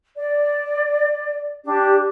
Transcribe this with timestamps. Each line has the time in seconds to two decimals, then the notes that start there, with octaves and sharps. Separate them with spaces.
0.16 D5
1.64 D4 G4